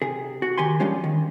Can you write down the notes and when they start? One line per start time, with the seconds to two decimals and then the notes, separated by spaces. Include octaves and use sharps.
0.02 C3 G#4
0.42 F#4
0.58 D#3 G4 G#5 C6
0.80 F3 G3 G#3 C#4 D4 F4
1.04 D#3